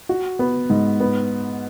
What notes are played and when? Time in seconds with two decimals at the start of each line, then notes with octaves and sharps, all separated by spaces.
0.09 F#4
0.39 B3
0.70 G#2
1.00 B3